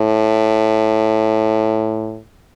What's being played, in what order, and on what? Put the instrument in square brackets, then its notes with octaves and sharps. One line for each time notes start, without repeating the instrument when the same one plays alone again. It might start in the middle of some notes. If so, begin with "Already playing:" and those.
Already playing: [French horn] A2